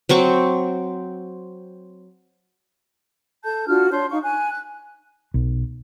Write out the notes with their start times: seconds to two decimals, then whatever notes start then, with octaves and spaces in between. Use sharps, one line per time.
0.09 F#3 C4 C#6 D6
3.44 A4 A5 G6
3.67 D4 F4 F#4 F6
3.90 D4 C#5 C6 G6
4.11 D#4 F5 C#6
4.23 G#5 F#6
4.50 F#6
5.34 B1